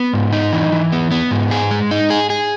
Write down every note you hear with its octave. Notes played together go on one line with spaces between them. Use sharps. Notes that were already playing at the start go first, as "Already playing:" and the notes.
Already playing: B3
G#2
D#4
E3
E3
B3
B3
G#2
G#4
G#3
D#4
G#4
G#4